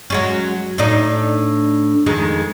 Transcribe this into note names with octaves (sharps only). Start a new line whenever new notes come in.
F#3 G#3 C#4
A2 D4 D#4
F2 D#3 G#3